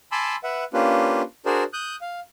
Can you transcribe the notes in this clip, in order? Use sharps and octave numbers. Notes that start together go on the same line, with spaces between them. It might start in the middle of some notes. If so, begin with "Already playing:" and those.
G#5 A5 B5 C6 D6 E6
B4 E5 F#5
A#3 C#4 D4 F4 G4 B4
D4 F#4 G#4 A#4 C5 D5
D#6 F#6 G6
F5